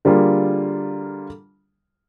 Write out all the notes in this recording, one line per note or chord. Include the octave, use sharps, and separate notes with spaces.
D3 G3 A#3 F4 G#4